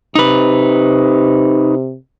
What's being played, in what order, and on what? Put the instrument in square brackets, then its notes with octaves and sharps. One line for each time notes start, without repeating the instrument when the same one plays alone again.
[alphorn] C3 [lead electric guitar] D#4 B4